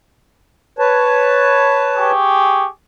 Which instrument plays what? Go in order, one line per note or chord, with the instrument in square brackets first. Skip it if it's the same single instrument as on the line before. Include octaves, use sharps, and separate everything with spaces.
[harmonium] B4 C#5 A5
[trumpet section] G4 G#4 C#6